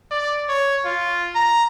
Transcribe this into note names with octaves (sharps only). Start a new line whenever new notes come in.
D5
C#5
F4
A#5